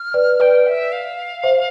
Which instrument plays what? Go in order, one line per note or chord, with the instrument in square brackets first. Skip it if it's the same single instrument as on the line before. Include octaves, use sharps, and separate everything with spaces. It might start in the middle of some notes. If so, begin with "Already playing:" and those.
Already playing: [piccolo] F6
[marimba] B4 D5
[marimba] B4 D5 [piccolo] G5
[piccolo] E5
F5
[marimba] C5 E5